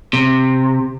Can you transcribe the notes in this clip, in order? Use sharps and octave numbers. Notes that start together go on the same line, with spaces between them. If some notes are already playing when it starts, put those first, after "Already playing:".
C3